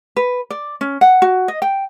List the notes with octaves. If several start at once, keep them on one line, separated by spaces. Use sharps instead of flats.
B4
D5
C#4
F#5
F#4
D#5
G5